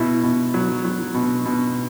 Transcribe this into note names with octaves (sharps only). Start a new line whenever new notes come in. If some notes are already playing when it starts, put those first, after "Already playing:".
Already playing: B2 E4
B2
F#3
F#3
B2
B2